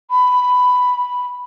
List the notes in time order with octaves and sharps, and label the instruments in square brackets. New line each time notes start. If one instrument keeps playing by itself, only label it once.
[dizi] B5